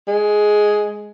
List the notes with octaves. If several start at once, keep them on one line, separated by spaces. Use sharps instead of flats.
G#3